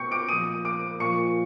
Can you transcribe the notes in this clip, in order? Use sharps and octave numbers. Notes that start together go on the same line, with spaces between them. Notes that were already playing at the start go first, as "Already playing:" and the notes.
Already playing: B2 G5 C#6 G6 C#7
D6 D7
A#2 F3 D#6 D#7
D6 D7
A#2 F3 C#6 C#7